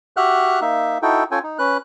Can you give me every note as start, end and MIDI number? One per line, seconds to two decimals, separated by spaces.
0.17 0.60 66
0.17 0.60 67
0.17 0.60 76
0.17 0.60 78
0.17 0.60 89
0.17 0.60 90
0.61 0.98 58
0.61 0.98 63
0.61 0.98 76
1.02 1.24 63
1.02 1.24 64
1.02 1.24 66
1.02 1.24 69
1.02 1.24 79
1.31 1.39 61
1.31 1.39 65
1.31 1.39 69
1.31 1.39 79
1.31 1.39 80
1.43 1.58 63
1.59 1.77 61
1.59 1.77 71
1.59 1.77 90